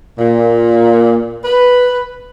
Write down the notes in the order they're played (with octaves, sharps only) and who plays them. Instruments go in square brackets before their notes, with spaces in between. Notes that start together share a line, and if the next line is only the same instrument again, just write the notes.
[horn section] A#2
B4